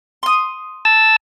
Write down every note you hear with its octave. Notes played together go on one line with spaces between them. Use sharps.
C6 D#6
A5 E6